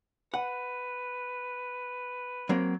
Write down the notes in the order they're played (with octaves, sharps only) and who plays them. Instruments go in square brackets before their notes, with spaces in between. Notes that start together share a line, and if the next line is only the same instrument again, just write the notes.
[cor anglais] B4 [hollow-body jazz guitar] F#5
[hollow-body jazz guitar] F#3 A#3 C4